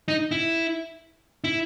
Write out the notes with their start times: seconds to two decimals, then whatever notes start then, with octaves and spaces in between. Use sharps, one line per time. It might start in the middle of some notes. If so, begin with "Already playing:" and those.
0.08 D#4
0.31 E4
1.44 E4